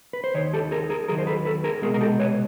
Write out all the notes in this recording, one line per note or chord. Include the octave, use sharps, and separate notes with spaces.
B4
C5
D#2 D#3 C#5
G4 A4
G#4 A#4
G#4 A#4
D#2 D#3 F#3 G#4 A#4
C5
A4 B4
A4 B4
G#4 A#4
C2 B2 G#3 B3 G#4 A#4
A#4
G4 A4
B4 C#5